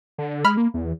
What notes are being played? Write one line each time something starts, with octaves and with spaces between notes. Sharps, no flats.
D3
G#3 B5 F6
A#3
E2